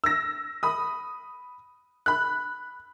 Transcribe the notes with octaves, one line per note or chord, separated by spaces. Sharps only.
E6 A#6
B5 D#6
B5 F#6